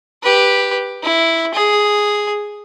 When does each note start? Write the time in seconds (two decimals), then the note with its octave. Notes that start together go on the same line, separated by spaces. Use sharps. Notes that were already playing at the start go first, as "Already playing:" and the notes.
0.23 G4 B4
1.03 E4
1.54 G#4